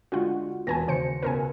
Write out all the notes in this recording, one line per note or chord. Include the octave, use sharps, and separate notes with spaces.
D3 G#3 F4 F#4 F#5
E1 F#4 B4 G#5 A5 A#6
D#2 C#3 C5 C#7
C#2 B2 A#4 B4 G#5